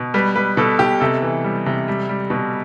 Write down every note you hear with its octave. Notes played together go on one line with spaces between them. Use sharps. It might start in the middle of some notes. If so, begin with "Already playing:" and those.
Already playing: B2
G3 B4
G3 B4
B2 A4
B2 G4
C3 A4
E3
G3
C3
G3
G3
B2